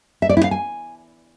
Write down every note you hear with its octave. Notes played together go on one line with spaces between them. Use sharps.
E5
D5
E4
F5
G#5